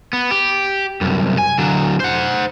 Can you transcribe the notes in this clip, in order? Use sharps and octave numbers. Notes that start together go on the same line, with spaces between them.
B3
G4
C2 F#2
G#5
D3 F#3
C5 F#5